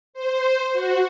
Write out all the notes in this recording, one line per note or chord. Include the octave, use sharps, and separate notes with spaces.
C5
F#4